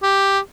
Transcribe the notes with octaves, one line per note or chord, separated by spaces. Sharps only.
G4